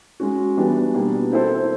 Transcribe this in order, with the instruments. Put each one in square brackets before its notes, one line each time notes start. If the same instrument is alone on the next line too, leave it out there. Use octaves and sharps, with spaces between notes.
[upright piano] G#3 C#4 F#4
E3 G3 B3 D4
B2 G3 A#3 D4
C4 E4 A4 C5